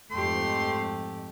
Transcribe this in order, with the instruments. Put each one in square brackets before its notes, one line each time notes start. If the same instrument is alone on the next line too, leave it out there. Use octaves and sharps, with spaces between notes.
[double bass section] F2 G#2 [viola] A3 G4 [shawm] C6